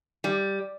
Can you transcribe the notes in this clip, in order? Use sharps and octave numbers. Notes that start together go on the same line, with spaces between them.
G3